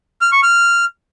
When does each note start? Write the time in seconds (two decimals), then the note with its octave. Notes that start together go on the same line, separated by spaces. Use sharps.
0.21 F6
0.32 C#6
0.43 F6